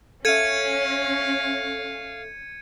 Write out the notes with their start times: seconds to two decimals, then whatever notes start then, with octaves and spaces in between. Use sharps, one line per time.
0.25 C#4 A4 E5 F5 G#6 C#7 D#7